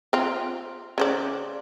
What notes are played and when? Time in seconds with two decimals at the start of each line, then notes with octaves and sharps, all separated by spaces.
0.13 C4 F4
0.98 C#3 C5 D5